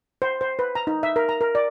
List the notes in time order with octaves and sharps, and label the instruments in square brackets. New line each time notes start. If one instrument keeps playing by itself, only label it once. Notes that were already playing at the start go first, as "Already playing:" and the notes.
[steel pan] C5
C5
B4
A#5
D#4
E5
A#4
A#5
A#4
D5